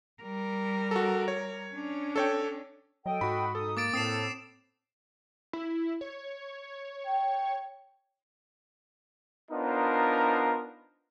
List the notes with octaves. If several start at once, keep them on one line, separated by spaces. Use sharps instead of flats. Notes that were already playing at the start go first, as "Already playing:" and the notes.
G3 A#4
F#4 A4
C#5
C#4 D4
A4 C#5 G5
F#3 A4 D#5 G5
G#2 F#4 B5
B2 D#4 A4 D#6
A#3 D6 A6 D7
A2 C4 A4 D#6 C7 E7
E4
C#5
G5
B3 D4 D#4 F4 A#4 C5